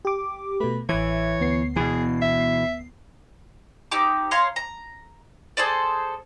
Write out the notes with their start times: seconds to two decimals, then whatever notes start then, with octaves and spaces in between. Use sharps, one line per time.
0.05 G4 D6
0.60 B2 A3 B4
0.89 A1 E3 C#5 E5
1.40 D2 B3 C7
1.76 B2 E3 G#4
2.22 E5
3.91 C4 D#4 G4 D6
4.31 C#5 F5 A#5 C6
4.56 A#5
5.57 G#4 A4 C5 D5